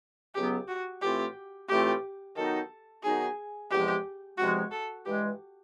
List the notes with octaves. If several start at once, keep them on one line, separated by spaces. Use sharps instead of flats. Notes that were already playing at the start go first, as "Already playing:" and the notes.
C#2 C#3 F#3 B3 G4
F#4
A2 E3 A3 C4 F4 G4
A2 E3 A3 C4 F4 G4
D#3 F#3 B3 D#4 A4
D#3 F#3 B3 D#4 G#4
E2 C3 F3 G#3 G4
E2 C3 F3 G#3 F#4
A4
G2 E3 G#3 G4